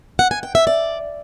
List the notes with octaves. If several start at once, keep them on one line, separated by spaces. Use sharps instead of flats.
F#5
G#5
G5
E5
D5